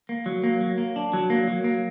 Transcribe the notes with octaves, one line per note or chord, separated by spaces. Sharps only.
A#3
F#3
A#3
F#3
A#3
D4
F#3
A#3
F#3
A#3